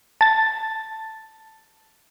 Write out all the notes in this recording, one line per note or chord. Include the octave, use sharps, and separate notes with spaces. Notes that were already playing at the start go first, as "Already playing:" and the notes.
A5 A6